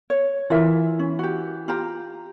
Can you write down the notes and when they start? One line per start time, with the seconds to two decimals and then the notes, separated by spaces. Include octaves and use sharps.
0.10 C#5
0.50 E3 F4 A#4 E5
0.99 C#4
1.19 F#4 G4
1.68 F4 G4 A#5